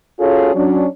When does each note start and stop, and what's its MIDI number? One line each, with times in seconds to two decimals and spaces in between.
0.20 0.53 61
0.20 0.53 65
0.20 0.53 66
0.20 0.53 68
0.20 0.53 69
0.20 0.53 73
0.55 0.85 54
0.55 0.85 61
0.55 0.85 62